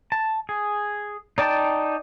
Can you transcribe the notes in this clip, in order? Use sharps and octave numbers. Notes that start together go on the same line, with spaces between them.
A5
G#4
D#4 D5 G5 A5